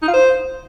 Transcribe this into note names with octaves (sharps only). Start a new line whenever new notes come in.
D#4
F4
C5